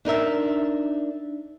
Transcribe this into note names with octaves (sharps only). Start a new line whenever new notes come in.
D4 D#4 A#4 E5